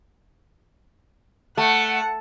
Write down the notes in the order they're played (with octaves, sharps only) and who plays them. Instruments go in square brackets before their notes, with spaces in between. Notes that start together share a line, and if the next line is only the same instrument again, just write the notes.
[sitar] A3 [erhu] F#5